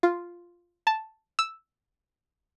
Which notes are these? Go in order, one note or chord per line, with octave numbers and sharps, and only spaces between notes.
F4
A5
E6